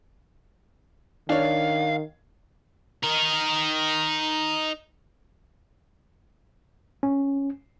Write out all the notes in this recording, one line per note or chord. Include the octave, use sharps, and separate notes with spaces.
D#3 D4 C#5 F5
D#4 A#4
C#4